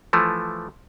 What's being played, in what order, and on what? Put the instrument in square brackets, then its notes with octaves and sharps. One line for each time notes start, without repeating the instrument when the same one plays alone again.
[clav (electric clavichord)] E3 F3 A3